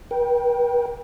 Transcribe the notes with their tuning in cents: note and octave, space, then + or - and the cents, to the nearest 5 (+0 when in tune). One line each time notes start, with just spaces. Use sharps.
B4 -45 G5 -5